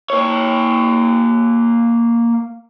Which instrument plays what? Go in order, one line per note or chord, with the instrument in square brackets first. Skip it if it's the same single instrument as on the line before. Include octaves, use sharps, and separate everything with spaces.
[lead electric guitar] A#3 C#5